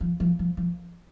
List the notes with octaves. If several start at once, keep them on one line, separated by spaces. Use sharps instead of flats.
F3
F3
F3
F3